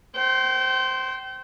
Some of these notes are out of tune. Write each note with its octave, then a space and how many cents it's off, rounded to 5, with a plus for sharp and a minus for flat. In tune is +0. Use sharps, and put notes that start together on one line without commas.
C5 +0 G5 -35